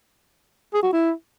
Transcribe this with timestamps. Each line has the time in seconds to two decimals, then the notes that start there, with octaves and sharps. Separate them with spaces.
0.73 G#4
0.83 F#4
0.93 E4